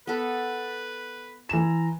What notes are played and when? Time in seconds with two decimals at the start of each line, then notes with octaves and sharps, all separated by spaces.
0.07 B3 A4 B4
1.49 E3 A#5 E7